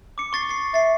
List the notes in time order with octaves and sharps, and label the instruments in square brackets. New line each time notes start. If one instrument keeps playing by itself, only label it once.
[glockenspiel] D6 C#7
C#6 A6 C7
A6 C7
[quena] E5 [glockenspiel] A6 C7